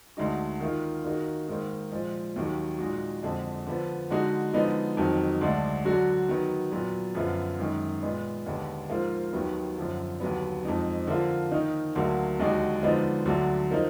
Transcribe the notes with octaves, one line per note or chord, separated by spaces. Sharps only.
D2 D3 G#3 D#4 F#4
D#3 A#3 F4
D#3 A#3 D#4 F#4
G#2 D#3 A#3
A#2 F3 G#3
D#2 D#3 F#3
A#2 G#3 D#4 F#4
F2 D3 G#3
D3 F3 B3
D3 G#3 D#4 F#4
D3 F3 G#3 B3 D#4
F2 D#3 F#3
D2 D3 G#3 D4
D3 F#3 D4 F#4
D#3 F#3 B3
A#2 F#3 B3
F#2 D3 F3 B3 F4
F#2 D#3 G#3
A#2 G#3 B3
D#2 D3 G#3 B3
G#2 F3 A#3 F4
D#2 D#3 F#3 B3
F#2 D3 F3
D#2 D3 F#3 B3
F2 F3 G#3 D#4
D3 F3 A#3 F4
D#3 A#3 D#4
D2 D3 F#3 A#3
D#2 D3 G#3 D#4 F#4
D3 F3 G#3 B3 D#4
D2 D3 F#3 D4
F3 A#3 D#4